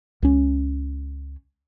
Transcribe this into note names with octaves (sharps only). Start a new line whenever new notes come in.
C#2 C#4